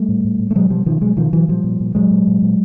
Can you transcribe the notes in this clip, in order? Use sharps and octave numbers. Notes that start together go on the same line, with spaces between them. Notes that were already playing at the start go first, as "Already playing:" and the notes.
Already playing: G3 A3
A2
A2
A2
A3
B2 F#3 G#3
B2 F3 G3
B2 D#3 F3
B2 F#3 G#3
B2 D#3 F3
B2 E3 F#3
A#2 F3 G3
A#2
A#2
A#2 F#3 G#3
A#2
A#2
A#2